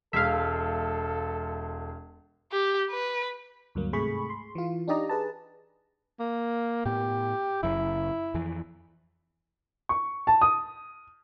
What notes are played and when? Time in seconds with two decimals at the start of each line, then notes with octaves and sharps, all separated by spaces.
0.13 E1 G#3 A4 E5 F5
2.52 G4
2.91 B4
3.75 D2 G2 F#3 A#3
3.93 G#2 C3 A3 G#4 B5 C#6
4.30 C6
4.55 E3 F4
4.88 D4 D#4 G4 D5 D#5 A#5
5.09 G#4 B4 A5
6.20 A#3
6.85 A2 B3 G4
7.63 F#1 F#2 C#3 E4
8.34 F2 E3
9.89 C#6
10.27 A5
10.41 D#6